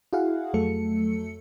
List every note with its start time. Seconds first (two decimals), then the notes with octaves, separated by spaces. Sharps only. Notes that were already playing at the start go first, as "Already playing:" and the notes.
0.13 E4 F#4 G#4 F5 F#5
0.54 F2 F#3 A3 A4 C#7